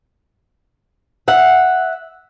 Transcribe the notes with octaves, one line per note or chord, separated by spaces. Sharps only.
E5 F#5